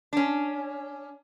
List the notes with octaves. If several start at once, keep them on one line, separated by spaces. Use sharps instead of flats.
C#4 D4